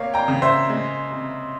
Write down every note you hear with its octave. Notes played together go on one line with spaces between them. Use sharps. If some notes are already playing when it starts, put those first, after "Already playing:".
Already playing: C3 A#3 C#5 F5
G5 A#5
C#3
C5 E5
G#3
C3